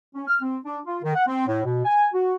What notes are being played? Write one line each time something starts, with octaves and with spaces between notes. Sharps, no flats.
C#4
F6
C4
D4
F4
D#3
F#5
C4
A2
B2
G#5
F#4